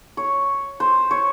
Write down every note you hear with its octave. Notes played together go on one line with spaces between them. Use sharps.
C#5
C5
C#5